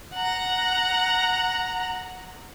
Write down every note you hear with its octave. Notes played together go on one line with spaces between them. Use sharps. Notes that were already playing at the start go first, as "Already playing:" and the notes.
F#5 A#5